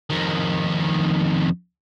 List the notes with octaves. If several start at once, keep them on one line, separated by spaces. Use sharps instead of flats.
F2 D#3